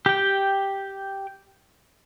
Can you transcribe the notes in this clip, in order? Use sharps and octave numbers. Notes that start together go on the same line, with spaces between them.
G4 G5